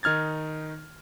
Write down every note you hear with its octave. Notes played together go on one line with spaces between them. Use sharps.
D#3 D#4 F6 G#6 A6